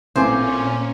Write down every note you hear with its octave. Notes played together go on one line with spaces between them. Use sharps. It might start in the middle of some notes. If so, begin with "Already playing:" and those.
A1 A#2 A3 A#3 C4 C#4 C5 G#5